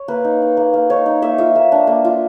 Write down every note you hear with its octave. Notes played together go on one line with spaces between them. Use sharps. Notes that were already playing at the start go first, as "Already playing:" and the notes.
Already playing: C#5
A#3 B4
D#4
D#4
A#3
A#3
D#4 C#5
D#4
A#3 E5
F4 E5
A#3
D4
A#3
F4